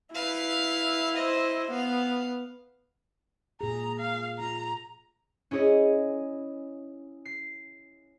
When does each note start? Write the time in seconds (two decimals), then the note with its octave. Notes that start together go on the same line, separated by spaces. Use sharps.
0.15 E4 B4 F5
1.16 C5 D#5
1.71 B3 F5
3.61 A#2 G#4 A#5
4.00 F5
4.39 F4 A#5
5.51 C#4 E4 G#4 C#5 D#5
7.25 C7